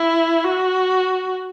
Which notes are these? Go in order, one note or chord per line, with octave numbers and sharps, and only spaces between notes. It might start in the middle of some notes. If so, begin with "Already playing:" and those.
Already playing: E4
F#4